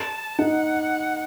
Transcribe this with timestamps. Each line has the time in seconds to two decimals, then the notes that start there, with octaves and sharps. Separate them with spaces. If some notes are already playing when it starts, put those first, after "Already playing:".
Already playing: A5
0.39 D#4 F#5